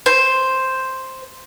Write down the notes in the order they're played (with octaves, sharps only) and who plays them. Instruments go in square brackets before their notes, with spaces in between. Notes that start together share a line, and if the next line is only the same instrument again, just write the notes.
[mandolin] C5